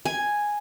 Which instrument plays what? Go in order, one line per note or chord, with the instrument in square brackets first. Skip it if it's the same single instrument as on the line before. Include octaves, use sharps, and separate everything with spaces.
[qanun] G#5